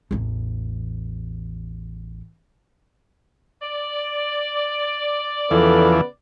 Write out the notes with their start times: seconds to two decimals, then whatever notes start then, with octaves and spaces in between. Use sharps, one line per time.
0.11 A1 E2
3.62 D5
5.51 E2 C#3 E3 F3 B3 A4 B4